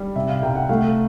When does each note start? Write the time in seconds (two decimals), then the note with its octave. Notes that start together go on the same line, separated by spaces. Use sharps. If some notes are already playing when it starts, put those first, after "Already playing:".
Already playing: G3
0.16 C3 E5
0.29 F5
0.42 C2 G5
0.56 F#5
0.69 A3 F5